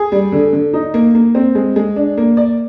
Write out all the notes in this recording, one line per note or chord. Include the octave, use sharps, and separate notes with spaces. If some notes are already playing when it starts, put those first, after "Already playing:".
Already playing: G#4
G3
D3
D3
D#4
A#3
A#3
C4
G#3
G#3
D4
A#3
D5